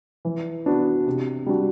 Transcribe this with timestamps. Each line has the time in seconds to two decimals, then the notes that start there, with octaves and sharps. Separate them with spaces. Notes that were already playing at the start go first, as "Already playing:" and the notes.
0.25 E3
0.66 B3 D4 F#4
1.07 C3
1.46 G3 D4 F#4